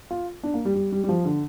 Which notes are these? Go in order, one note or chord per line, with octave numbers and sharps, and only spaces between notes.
F4
D4
A#3
G3
G3
G3
G3
F3
D3